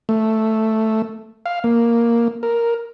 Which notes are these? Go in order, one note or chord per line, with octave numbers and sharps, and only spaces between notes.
A3
F5
A#3
A#4